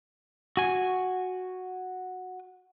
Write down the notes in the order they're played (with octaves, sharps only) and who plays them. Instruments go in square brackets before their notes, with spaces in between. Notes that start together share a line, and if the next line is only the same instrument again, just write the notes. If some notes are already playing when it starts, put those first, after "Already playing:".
[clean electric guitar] F#4 G#5